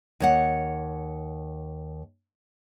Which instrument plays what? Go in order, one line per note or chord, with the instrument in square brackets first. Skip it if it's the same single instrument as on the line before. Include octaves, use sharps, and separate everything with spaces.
[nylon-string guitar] D#2 C#5 F#5